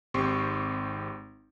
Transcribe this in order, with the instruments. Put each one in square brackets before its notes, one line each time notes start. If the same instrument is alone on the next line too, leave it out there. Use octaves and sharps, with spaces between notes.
[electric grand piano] G#1 C4 G4 C6 C#6